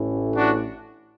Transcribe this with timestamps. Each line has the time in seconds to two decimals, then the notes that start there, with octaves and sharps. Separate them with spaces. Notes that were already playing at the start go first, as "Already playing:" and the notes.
Already playing: A1 A2 E3 A3
0.35 D4 F#4